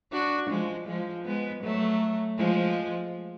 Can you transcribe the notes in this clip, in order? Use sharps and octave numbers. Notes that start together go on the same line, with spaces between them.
D4 F#4
F3 G#3
F3 G#3
G#3 B3
F#3 A3
F3 G#3